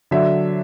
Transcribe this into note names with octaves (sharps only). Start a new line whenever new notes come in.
D3 F#3 D4 E5